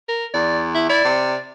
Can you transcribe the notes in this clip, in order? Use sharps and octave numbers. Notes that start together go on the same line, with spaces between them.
A#4
E2 D5
E4
E4 D5
C3